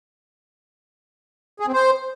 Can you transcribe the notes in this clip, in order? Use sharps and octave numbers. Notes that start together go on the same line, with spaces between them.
G#4
C4
C5